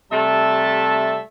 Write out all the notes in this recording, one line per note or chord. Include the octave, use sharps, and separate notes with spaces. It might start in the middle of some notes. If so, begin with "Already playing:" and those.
C3 G3 A3 E5 A5